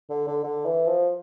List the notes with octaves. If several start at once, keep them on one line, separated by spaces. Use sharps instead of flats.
D3
D3
D3
E3
F3